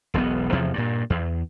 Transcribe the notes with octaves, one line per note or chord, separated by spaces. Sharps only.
E1 B1 C3 B3
E2 C3 F3
G2 A#2
E2